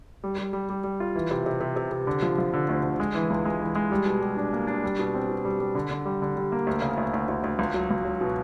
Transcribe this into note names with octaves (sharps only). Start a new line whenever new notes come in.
G3
G3
G3
G3
G3
F4
E3
C3
C3
C3
C3
C3
D3
F3
F3
D3
D2
D3
G#3
E3
C#2
G#3
E3
G#3
G3
B2
G3
D4
A#3
D4
G3
B2
C4
B2
G3
G3
D3
D3
G3
D3
G3
A#3
D2
C#3
D2
D2
D2
D2
C#2
F#3
C#2
F#3
B2